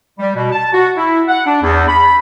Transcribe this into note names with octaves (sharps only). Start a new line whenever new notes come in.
G3
B2
A5
F#4
E4
F#5
D4
E2
B5